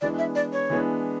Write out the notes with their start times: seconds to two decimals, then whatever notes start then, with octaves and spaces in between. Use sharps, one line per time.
0.01 E3 G#3 B3 D4 D5
0.19 E5
0.35 D5
0.53 C#5
0.70 E3 G#3 B3 D4